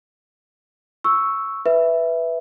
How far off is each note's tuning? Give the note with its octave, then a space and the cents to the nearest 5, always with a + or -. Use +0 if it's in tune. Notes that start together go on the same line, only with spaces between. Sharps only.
C#6 +0 E6 +0
B4 +0 E5 +0